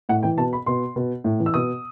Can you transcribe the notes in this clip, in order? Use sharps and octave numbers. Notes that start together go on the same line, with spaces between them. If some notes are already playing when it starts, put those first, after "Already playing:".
A2 F#5
E3 G5
B2 A5
B5
B2 C6
B2
A2
E3
E6
B2 D#6